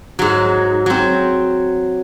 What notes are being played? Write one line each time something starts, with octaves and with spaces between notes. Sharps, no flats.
G#2 F#3
F#3 C4